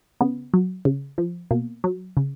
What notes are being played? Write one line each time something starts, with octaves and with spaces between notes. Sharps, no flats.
C#3 B3
F#3
C#3
F3
B2 A#3
F#3
C#3